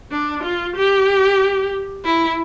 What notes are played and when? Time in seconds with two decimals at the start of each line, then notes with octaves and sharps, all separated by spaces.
0.12 D4
0.43 F4
0.76 G4
2.05 E4